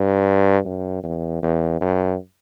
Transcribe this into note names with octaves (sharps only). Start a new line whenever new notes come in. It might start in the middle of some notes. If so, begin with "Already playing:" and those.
Already playing: G2
F#2
E2
E2
F#2